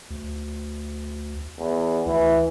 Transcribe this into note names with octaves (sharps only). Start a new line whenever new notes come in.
D2
E2
D2 E3